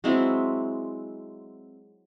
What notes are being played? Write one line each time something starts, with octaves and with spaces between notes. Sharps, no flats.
F#3 G#3 C4 E4